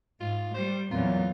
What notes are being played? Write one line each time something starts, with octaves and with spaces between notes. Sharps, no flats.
G#2 F4
G3 C5
E2 A#2 F#3 C4 F4